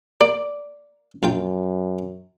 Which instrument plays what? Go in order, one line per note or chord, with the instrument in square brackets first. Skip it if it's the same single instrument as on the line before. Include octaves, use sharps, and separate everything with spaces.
[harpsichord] A#3 [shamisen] D5
[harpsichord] A#1 F4 G5 [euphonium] F#2